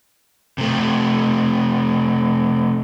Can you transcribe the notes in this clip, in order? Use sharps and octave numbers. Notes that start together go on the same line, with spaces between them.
C3 A3